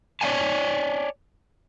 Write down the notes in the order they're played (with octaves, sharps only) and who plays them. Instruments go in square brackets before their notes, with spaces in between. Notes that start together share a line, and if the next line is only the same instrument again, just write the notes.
[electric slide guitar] C#5 D5 E5 F5 G#5 A5